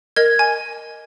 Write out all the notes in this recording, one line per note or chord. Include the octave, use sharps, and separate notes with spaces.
A#4 D#5 G#6
G#5